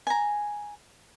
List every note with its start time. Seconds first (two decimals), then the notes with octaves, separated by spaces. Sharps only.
0.07 G#5 A#5